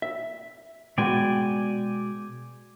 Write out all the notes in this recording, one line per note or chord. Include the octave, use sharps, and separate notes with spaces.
E5
B2 G#3 F#4 D5 G5 G#5